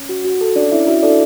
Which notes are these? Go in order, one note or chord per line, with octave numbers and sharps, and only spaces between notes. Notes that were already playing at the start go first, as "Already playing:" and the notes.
Already playing: C#4
F#4
F#4
A4
C#4 D4 D5
C#4 E4 E5
E4 F#4 E5
D4 A4 D5